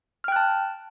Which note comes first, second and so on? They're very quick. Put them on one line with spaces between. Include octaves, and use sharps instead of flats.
F6 G5 F#6 A5